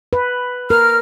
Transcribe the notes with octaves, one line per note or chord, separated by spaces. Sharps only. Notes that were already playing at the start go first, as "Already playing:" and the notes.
B4
A#4 F6